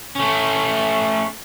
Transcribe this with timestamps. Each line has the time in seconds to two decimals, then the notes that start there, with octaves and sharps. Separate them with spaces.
0.16 A3 C#4